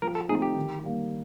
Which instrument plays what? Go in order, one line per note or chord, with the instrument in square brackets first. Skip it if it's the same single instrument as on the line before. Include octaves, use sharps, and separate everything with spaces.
[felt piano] F3 [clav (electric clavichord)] A#4
[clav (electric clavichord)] A4
[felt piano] A3 C4 D#4 [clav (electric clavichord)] G#4
[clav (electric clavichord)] G4
[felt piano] D#3
G3 A#3